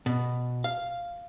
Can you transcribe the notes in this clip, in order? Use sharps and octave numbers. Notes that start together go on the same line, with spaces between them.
B2
F5